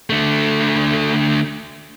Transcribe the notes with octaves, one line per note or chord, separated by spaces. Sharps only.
D3 A3